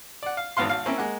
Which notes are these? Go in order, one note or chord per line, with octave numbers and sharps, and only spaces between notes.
D5 F#5
F5
G#1 E2 G#2 B3 F5 C6
G#1 F5
A#3 C4 C#4 E4
G#3 A#3 F#5